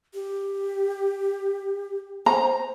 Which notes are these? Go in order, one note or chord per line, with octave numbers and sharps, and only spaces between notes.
G4
C5 A#5